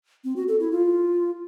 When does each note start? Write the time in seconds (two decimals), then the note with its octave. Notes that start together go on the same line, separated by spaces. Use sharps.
0.24 C4
0.36 F#4
0.48 A4
0.60 E4
0.72 F4